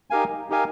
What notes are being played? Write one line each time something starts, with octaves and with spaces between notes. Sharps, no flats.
D#4 G4 A#4 F5 G#5
D#4 G4 A#4 F5 G#5